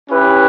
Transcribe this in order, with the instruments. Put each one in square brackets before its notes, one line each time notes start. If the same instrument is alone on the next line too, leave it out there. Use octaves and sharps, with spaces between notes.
[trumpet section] C#4 E4 G4 B4